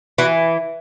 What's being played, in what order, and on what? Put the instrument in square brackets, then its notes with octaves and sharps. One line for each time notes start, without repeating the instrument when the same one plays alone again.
[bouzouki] E3 F#4